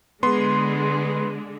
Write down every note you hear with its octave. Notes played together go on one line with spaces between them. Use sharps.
D3 G#3 B3 C6